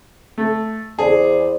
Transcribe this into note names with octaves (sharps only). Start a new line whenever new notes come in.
A3
E2 G#4 C5 D5